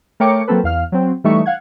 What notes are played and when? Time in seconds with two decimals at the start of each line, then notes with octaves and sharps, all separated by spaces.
0.20 A3 A#4 C#5 G5 D6 C#7
0.47 F#3 A#3 C4 A4 B4
0.64 E2 F5 F6
0.92 F#3 C4
1.24 E3 G3 A3 D#4 E5 C#6
1.46 F5 F#5 G#6